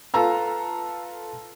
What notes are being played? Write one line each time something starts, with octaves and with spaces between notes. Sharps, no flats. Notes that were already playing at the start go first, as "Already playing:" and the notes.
F4 A4 B4 F5 A#5 E6